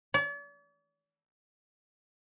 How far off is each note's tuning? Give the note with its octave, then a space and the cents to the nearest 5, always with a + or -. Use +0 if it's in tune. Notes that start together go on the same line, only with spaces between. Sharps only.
D5 -45